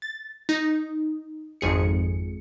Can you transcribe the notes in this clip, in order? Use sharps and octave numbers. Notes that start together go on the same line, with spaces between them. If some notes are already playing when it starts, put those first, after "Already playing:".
A6
D#4
G#1 F2 G#4 C#7